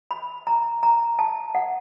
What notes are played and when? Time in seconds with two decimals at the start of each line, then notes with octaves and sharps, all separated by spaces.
0.11 B5
0.47 A#5
0.83 A#5
1.19 A5
1.55 F#5